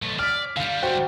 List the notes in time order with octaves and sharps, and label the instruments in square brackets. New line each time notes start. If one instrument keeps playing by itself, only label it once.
[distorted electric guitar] B1 A3
[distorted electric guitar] D5 [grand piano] F6 B6
[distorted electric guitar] D3 G3 [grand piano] F5
[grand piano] F#4 C5 G5